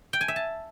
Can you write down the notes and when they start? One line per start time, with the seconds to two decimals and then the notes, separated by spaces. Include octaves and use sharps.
0.13 G5
0.21 G#5
0.28 E5
0.36 A5